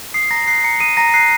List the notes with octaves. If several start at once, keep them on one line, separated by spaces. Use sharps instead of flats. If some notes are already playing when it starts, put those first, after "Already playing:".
D#6 C7
A#5 A#6
F#6 C7
A#5 C#7
D#6 D#7
A#5 A#6
F#6 C7